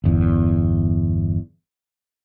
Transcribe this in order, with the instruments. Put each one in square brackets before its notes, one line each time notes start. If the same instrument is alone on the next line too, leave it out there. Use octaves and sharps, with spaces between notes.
[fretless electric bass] G1 E2